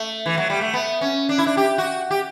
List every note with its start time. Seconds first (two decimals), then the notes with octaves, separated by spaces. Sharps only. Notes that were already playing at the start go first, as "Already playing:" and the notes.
Already playing: A3
0.26 E3
0.37 F#3
0.50 G3
0.61 A3
0.73 B3
1.01 C#4
1.29 D4
1.38 E4
1.47 D4
1.57 G4
1.78 F#4
2.11 G4